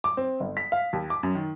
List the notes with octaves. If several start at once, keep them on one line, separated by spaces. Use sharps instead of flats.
D6
C4
G1
B6
F5
D#2
D6
F#2
D#3